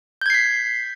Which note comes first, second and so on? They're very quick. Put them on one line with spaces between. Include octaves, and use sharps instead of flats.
G6 G#6 C7 B6